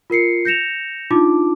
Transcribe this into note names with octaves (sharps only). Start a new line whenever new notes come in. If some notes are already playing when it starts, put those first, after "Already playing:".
F4 A#4 C7 C#7
G6 A#6 C#7 E7 F7
D4 D#4 F4 A5 D6